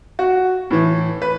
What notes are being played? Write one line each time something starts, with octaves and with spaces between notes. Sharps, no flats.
F#4
A2 E3
B4